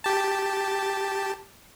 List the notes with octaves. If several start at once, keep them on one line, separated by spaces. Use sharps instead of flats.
G4 A5